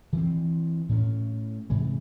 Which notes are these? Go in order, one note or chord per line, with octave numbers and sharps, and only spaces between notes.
E3 C4
A2 C#4
G#2 C3 E3